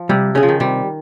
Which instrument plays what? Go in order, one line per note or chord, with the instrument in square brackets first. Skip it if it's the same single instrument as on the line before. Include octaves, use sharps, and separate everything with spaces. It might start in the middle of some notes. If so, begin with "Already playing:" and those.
Already playing: [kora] F3
[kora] C3 [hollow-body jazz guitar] G3
[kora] C#3 [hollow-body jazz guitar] C#4 G#4
[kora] F3
D#3
[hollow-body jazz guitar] C3 [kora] G3